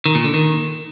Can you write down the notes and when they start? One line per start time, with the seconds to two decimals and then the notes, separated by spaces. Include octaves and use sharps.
0.06 D#3
0.15 A#2
0.24 D3
0.34 D#3